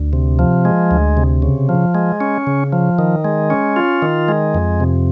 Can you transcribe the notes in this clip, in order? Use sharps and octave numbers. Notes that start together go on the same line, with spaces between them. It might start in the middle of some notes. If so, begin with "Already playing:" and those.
Already playing: D2
C3
F3
G#3
D2
C3
C#3
F3
G#3
C#4
C#3
F3
D#3
G#3
C#4
F4
D#3
G#3
F2
C3